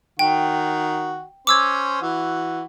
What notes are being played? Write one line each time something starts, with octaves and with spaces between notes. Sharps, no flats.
D#3 F#4 G5
C#4 C5 D6 E6 G#6
E3 F#4